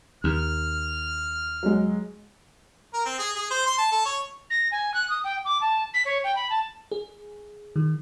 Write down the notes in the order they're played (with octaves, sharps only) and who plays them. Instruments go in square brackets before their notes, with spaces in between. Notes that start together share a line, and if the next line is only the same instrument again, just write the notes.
[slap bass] D#2 [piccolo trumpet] F6
[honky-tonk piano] F#3 G#3
[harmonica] A#4
C4
G#4
G#4
C5
C6
A5
A4
C#5
[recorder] A#6
G#5
F#6
D#6
G5
D6
A5
B6
C#5
G5
B5
A5
[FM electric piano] G#4
D#3